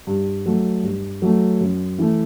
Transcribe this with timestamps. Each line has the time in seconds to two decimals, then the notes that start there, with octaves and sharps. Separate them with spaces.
0.07 G2
0.46 F#3 A3
0.83 G2
1.22 F#3 A3
1.61 F#2
1.99 E3 A3